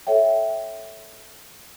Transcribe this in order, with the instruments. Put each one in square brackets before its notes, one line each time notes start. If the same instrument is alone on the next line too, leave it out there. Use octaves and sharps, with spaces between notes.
[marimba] A4 C#5 E5 G5